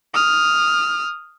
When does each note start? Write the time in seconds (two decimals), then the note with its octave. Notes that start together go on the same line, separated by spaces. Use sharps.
0.15 D#6 F6